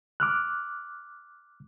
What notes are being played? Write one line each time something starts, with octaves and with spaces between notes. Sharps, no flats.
D6 F6 F#6